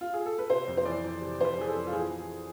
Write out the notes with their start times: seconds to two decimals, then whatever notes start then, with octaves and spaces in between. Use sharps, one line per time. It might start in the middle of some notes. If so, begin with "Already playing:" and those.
0.01 F4
0.14 G#4
0.26 A4
0.38 B4
0.50 C3 C5
0.67 F2
0.77 C5
0.85 E3 D5
1.04 F2
1.21 C3
1.39 F2 C5
1.44 B4
1.56 E3 G#4
1.69 A4
1.75 F2
1.87 F4
1.93 E3 G#4
2.10 E3